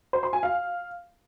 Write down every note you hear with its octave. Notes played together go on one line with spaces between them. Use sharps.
C5
C6
G#5
F5